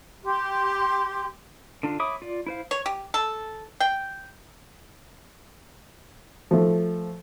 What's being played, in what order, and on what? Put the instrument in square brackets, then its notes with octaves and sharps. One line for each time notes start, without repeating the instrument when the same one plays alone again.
[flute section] G4 C6
[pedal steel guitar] D3 D4 F4
C#5 E5 B5 D6 D#6
F4 D5
E4 C5 F5
[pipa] C#5
G4
A4
G5
[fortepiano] F3 A3